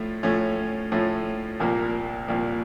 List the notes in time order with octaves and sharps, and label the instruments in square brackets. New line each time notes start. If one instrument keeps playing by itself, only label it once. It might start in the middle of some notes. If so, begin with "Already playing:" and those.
Already playing: [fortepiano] A2 F3 A3
A2 F3 A3 C#4
A2 F3 A3 C#4
C2 A#2 F3 A#3
C2 A#2 F3 A#3